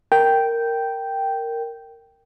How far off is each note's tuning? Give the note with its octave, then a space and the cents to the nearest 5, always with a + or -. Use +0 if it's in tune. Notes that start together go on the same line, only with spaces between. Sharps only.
A#4 -10 G5 -5